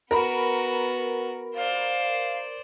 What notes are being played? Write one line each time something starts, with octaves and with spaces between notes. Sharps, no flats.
B3 F#4 A#4 A#5 B5
C5 D5 F5